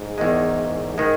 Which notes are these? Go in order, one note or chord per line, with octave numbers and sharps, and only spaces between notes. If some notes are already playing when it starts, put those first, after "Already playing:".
Already playing: G#2
E2 D#3 G#3
D#3 G#3